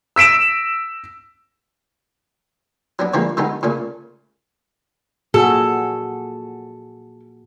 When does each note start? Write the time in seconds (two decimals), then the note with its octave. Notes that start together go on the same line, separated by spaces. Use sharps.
0.16 E6 B6 D7 E7
2.99 F#3 B3 D4
3.14 D3 E3 F3 G3 G#3 A#3
3.37 D3 G3 G#3 B3 D#4
3.63 A#2 C#3 A3
5.34 A#2 F#4 G#4 A4